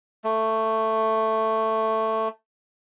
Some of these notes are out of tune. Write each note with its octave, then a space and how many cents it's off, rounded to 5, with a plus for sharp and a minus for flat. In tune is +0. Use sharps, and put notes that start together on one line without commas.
A3 +10